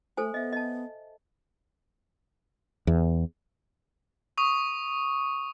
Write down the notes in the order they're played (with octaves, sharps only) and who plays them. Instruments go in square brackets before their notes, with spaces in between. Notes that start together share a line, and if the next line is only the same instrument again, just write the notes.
[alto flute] A3 [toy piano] A4 C5 G#5
[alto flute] B3 [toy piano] D#5 E5
[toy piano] D#5 A5
[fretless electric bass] E2
[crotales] C#6 D#6